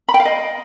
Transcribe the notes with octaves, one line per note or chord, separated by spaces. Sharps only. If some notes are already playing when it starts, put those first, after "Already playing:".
B5
G5
F5
D#5